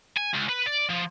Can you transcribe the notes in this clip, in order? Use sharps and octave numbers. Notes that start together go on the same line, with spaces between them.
G#5
C#2
B4
D5
F3